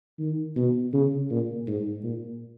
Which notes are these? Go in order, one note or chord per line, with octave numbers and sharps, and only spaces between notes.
D#3
B2
C#3
A#2
G#2
A#2